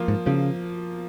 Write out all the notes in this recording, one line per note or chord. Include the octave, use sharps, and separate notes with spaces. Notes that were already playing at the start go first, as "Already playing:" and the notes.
Already playing: F3 A#3 F4
G#2
C#3 F3